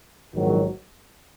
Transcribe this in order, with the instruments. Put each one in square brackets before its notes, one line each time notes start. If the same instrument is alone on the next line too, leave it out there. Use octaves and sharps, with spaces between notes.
[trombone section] A#1 G#2 D#3 F#3